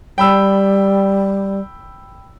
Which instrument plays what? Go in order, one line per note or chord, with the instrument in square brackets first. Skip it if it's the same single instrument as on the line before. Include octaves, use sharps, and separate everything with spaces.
[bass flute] G3 [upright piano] G5 B5 E6